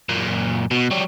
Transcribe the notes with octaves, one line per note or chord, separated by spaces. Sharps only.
F#2 A#2
B2
F#3 G3